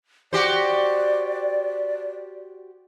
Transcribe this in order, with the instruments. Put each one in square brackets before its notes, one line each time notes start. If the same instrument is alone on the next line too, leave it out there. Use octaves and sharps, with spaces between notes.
[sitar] F#4 G4 C5 [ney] D5